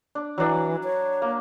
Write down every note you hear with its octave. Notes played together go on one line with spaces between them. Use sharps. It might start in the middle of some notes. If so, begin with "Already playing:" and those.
D4
E3 F#3 D4
C#5
A#3